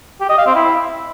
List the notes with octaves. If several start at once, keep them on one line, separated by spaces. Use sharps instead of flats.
G4
D#5
F5
C4
E4